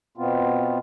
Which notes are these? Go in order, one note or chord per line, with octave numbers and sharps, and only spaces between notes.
B2 B3 C4 F4